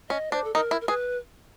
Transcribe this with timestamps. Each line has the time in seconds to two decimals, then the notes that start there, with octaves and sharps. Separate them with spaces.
0.09 C#4 D#5
0.32 D4 C5
0.44 A4
0.54 D#4 A#4
0.71 E4
0.81 A#4
0.88 G#4 B4